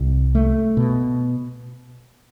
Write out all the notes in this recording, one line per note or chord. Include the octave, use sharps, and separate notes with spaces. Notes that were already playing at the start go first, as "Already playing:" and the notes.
Already playing: C2
A3
B2